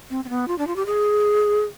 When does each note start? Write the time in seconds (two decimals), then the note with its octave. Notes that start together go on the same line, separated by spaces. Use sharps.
0.10 C4
0.25 C4
0.29 B3
0.48 F4
0.58 D4
0.67 F4
0.76 G4
0.86 G#4